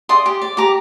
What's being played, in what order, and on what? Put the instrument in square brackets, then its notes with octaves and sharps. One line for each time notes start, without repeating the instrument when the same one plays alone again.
[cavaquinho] D5 C6 D#6
G4
D5
G4 A#5 D6